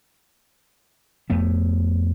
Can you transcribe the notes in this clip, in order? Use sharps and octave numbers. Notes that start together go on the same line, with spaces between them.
F2 A3 B3